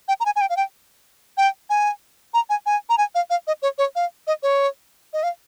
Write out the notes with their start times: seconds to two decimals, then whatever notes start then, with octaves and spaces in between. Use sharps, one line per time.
0.08 G5
0.20 A#5
0.26 G#5
0.36 G#5
0.41 G5
0.50 F5
0.57 G5
1.37 G5
1.70 G#5
2.34 A#5
2.50 G#5
2.66 G#5
2.90 A#5
2.98 G#5
3.15 F5
3.30 F5
3.47 D#5
3.62 C#5
3.78 C#5
3.96 F5
4.27 D#5
4.43 C#5
5.13 D#5
5.23 F5